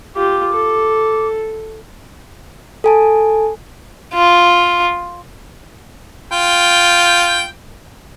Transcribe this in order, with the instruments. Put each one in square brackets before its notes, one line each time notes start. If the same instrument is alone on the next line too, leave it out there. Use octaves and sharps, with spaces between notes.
[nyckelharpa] F4 G4 [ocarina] D6
[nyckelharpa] A4
[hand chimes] A4 G#5 A5
[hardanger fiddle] F4
[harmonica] F4 G5